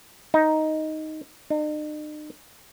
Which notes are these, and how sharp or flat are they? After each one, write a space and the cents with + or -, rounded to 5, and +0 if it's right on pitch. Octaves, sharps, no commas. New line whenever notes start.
D#4 +5
D#4 -45